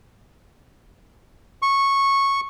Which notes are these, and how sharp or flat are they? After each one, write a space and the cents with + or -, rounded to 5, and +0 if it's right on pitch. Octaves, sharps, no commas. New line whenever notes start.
C#6 -10